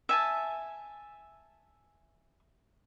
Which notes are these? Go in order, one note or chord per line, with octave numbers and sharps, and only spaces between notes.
E5 G#5 A5